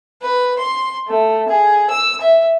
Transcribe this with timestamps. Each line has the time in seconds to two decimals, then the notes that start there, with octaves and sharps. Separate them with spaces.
0.22 B4
0.59 C6
1.08 A3
1.49 G#4
1.90 E6
2.21 E5